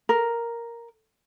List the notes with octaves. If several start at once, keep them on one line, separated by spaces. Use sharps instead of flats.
A#4